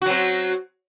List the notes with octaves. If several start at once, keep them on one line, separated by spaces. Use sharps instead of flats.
F#3 C4 F#4